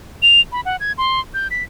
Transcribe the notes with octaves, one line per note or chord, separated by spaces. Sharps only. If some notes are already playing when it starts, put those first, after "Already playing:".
F7
B5
F#5
G#6
C6
G6
B6